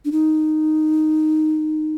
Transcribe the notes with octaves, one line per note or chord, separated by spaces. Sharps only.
D4
D#4